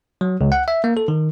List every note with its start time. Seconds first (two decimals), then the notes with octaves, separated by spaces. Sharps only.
0.21 F#3
0.41 C#2
0.52 F#5
0.68 E5
0.84 A#3
0.97 A4
1.08 D#3